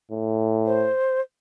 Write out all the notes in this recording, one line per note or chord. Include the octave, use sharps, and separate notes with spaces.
A2
C5